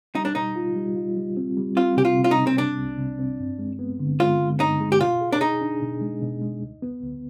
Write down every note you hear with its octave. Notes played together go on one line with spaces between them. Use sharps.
G3 D#4
D4
B2 D#4
F4
G3
F4
G3
C4
G3
C4 F4
C3 G4
F4
C3
F4
D#4
C3
C4
C3 D4
C2
C3
C4
G2
G#3
B3
D3
G#3 F4
D3
G2 D#4
G#3
G4
B2 F4
G#4
D4
D#4 G#4
D4
B2
G#3
B2
G#3
D2
B3
D2